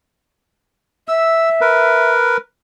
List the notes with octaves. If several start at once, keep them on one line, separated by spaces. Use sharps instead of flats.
E5 E6
A#4 B4